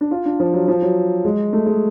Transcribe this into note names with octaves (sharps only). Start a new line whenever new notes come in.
D4
F4
D4
F3
F#3
F3
F#3
G#3
A3
G#3